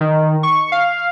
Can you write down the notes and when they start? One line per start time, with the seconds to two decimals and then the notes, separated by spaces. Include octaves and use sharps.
0.01 D#3
0.43 C#6
0.72 F5